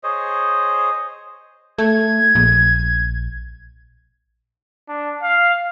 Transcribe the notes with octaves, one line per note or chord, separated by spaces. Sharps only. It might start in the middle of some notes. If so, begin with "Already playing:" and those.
G#4 C5 C#5 D#5
A3 G#6
A#1
D4
F5